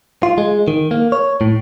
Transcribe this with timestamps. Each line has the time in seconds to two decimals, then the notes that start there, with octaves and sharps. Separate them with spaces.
0.23 F4
0.38 G#3
0.68 D#3
0.91 A#3
1.12 C#5
1.41 A2